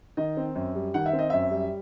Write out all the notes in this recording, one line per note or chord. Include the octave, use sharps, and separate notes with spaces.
D#3 D#5
C4
F#2
G3
D#3 F#5
E5
C4
D#5
F#2 E5
G3